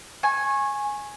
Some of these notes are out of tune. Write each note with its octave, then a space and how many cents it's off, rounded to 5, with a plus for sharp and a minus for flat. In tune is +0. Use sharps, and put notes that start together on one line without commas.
G#5 +0 C#6 -25